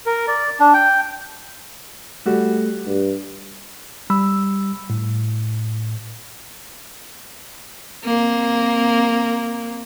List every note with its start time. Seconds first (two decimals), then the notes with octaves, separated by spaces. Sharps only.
0.06 A#4
0.28 D5
0.60 D4
0.74 G5
2.26 G3 A3 F#4
2.86 G2
4.10 G3 B5 E6
4.90 A2
8.05 A#3 C4